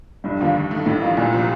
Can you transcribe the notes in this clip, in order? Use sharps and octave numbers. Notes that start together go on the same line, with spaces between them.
F1 G2
D#2 D3 F3 A#3
D#2
D#3 A3
A1 A2
G2 F3 A#3
C2 A#2
C3 F3